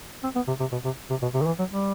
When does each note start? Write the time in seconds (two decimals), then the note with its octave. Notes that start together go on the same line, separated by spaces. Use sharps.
0.23 C4
0.35 B3
0.48 C3
0.60 C3
0.72 B2
0.85 C3
1.10 C3
1.22 B2
1.34 C3
1.42 D#3
1.46 E3
1.59 F#3
1.70 G3